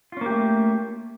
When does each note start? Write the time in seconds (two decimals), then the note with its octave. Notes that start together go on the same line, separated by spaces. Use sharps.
0.12 F4
0.17 C#4
0.21 A#3
0.26 G4
0.30 A3